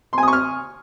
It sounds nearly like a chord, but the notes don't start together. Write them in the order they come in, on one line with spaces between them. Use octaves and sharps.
C6 G#5 D#6 C#6 F6